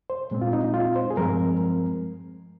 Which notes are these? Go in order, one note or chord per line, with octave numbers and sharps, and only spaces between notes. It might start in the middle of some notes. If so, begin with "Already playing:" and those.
C5
A#2 G#3 C4
F4
D#4
D#4
F4
C5
G#4
G2 F3 G#3 C4 A#4